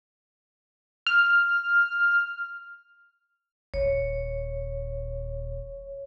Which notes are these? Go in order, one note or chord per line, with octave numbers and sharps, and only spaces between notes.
F6
D#1 C#5